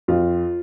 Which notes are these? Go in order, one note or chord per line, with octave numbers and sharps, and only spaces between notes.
F2 F4